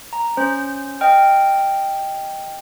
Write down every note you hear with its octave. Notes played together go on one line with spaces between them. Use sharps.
A#5
C#4 C5
D#5 G5 F6